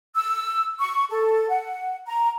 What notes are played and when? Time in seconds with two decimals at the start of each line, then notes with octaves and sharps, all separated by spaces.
0.15 E6
0.80 C#6
1.10 A4
1.49 F#5
2.07 A#5